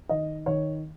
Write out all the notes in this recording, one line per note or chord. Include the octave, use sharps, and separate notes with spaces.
D#3 D#5
D#3 C#5